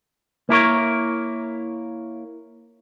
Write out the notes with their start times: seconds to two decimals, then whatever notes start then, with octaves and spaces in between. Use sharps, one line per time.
0.49 A#3 E4 A#4 C#5